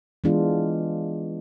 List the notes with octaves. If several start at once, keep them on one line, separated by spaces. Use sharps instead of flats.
E3 G#3 B3 D4 F4